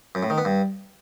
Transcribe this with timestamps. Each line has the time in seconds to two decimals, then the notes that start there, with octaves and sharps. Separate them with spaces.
0.15 F#2
0.23 A2
0.30 D#3
0.38 B3
0.45 G2